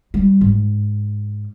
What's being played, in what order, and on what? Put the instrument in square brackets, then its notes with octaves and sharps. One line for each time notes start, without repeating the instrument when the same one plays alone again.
[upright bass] G3
G#2